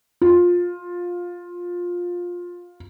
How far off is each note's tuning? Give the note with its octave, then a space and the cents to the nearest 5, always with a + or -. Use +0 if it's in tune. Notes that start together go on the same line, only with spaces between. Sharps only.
F4 +15